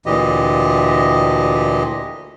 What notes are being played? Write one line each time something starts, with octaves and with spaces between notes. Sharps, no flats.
D2 A#2 E3 G4 D#5